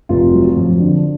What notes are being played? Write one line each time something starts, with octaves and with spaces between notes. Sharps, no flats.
F1 F4
F#3
F2
D3